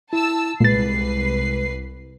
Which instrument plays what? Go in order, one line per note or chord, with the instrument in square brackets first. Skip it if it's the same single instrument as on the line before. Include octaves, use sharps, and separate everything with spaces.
[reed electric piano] E4 [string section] A5 E6
[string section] C2 B4 C7 [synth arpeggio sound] A#2 A6 [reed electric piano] G#3